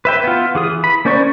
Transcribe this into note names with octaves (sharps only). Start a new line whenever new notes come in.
B4 E5 G5
B3 F4
E3 G#4 D#6
B5
A#3 C#4 C5 D5 C#6